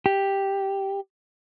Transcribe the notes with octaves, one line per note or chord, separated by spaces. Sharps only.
G4